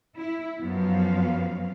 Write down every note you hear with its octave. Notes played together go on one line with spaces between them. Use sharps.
E4
F#2 F3 F#3 B3 F5